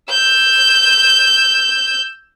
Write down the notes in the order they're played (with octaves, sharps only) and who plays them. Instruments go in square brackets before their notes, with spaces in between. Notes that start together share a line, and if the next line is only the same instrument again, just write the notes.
[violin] E6 G6